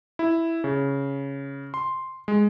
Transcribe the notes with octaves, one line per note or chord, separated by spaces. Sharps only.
E4
C#3
C6
G#3